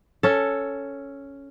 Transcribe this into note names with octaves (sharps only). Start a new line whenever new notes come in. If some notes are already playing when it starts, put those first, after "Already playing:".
C#4 A4